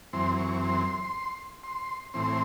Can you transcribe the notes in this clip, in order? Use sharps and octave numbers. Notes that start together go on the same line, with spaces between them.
F#2 E3 C4 C6
C#6
C6
C6
A2 E3 C4 C6